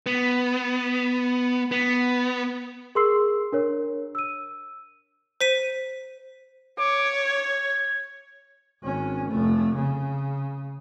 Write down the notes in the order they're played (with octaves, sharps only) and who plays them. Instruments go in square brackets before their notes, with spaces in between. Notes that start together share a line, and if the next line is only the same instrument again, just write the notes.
[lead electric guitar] B3
B3
[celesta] G#4 A#4 C6 E6 C7
D4 A#4 C#5
E6 D#7
[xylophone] C5 B6 D#7
[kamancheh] C#5 [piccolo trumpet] D6
[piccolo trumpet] G#6
[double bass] G#1 C#4
F1 A3
C#3